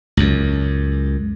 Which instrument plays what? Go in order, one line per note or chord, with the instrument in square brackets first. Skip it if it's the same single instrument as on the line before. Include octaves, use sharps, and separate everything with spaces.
[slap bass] C#2 F#2